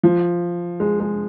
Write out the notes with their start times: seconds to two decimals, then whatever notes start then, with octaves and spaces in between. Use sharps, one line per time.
0.03 F3
0.80 G#3
1.00 G#3